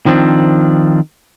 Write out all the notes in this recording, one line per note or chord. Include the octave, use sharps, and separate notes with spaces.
D#3 F3 C4 D4